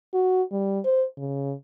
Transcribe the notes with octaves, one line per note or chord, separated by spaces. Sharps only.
F#4
G3
C5
C#3